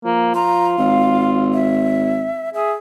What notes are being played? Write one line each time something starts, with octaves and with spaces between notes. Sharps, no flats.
F3 A#3
F4 A#5
G#1 F5
E5
G#4 E5